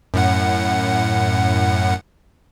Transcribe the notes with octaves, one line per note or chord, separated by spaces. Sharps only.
F#2 A2 F#5